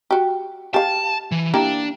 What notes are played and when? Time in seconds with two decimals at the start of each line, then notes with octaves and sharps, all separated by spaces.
0.11 F#4 G4
0.74 G4 F5 A5
1.32 E3
1.54 A#3 D4 E4 G4